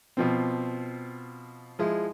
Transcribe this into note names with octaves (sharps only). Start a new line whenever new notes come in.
B2 F3 C4
F3 G#3 E4